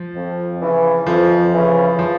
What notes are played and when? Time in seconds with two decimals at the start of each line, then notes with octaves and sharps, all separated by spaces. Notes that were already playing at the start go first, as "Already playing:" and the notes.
Already playing: F3
0.14 F2
0.60 C#3 E3
1.06 F2 F3
1.52 C#3 E3
1.99 F3